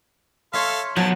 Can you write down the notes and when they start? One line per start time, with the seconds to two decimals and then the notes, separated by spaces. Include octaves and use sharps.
0.53 A4 C#5 E5 F5 C6
0.96 B2 F3 F#3 A5